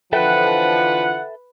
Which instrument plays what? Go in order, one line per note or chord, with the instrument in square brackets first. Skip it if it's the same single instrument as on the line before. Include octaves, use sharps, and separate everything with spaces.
[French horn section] D3 E3 F3 [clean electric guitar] A4 E5 G5 [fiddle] B4 [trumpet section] F#5